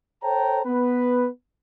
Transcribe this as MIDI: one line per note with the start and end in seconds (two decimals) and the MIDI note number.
0.23 0.60 69
0.23 0.60 72
0.23 0.60 73
0.23 0.60 79
0.23 0.60 81
0.23 0.60 82
0.65 1.27 59
0.65 1.27 71